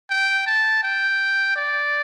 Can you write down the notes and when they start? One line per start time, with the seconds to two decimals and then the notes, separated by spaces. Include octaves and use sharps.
0.10 G5
0.47 A5
0.83 G5
1.56 D5